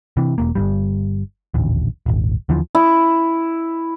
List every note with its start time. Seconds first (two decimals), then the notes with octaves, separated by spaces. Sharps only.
0.17 C3 E3
0.38 E1 A#3
0.55 G1 G2 G3
1.54 D#1 A1 D2
2.06 D#1 G#1
2.49 D#2 D3 E3 F3
2.75 E4